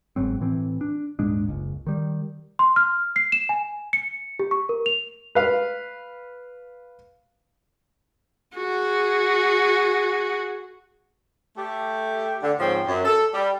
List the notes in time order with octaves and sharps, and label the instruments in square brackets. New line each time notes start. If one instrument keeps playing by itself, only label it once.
[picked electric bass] G1 G#2 F#3 C4
A2 E3 C4
D4
D#1 G#2 G#3 D4
F#1 C#2
D#3 G3
[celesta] C6
F6
C7
E7
G#5
C#7
G4
C#6
A#4
F7
[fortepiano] B4 F5
[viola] F#4 G#4
[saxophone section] A3 G4
D3
G#2 F3 C4 C#4
F#2
A4
G3